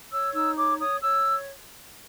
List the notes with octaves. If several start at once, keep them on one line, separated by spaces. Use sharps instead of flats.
C#5 E6
D#4 E6
C#5 D6
C#5 D#6
C#5 E6